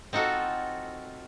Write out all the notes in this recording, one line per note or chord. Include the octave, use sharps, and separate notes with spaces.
C4 D#4 F4 F#4 A4